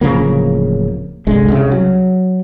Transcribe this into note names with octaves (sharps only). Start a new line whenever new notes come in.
D1 C#3 F3 A#3
G1 C2 D3 G#3
C2 C#3
F#3